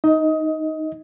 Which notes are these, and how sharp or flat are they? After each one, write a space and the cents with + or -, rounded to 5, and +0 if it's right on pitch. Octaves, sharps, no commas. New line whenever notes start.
D#4 +0 D#5 +20